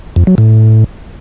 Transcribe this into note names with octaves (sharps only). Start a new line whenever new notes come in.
F2
F#3
A2